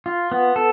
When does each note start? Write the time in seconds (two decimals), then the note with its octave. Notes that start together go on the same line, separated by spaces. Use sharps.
0.06 F4
0.32 B3
0.56 A4